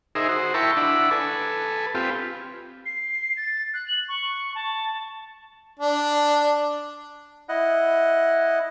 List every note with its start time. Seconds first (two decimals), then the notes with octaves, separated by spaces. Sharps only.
0.15 D#4 G#4 A#4 C5 E5
0.29 F#4 C5
0.54 E4 A#4 G5 A5 B5 C#6
0.77 D4 E4 F#5 B5
1.11 A4 B4 G#5
1.95 C4 F4 G4 B4
2.86 C7
3.37 A6
3.74 F#6
3.88 F#7
4.09 C#6
4.55 A5
5.79 D4
7.49 E4 D#5 F#5